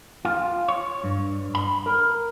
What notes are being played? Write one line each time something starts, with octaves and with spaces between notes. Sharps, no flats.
F4
C#5
G2
B5
A#4